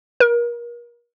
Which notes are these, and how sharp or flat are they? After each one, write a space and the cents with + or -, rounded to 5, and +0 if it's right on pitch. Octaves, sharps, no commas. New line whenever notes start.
A#4 +35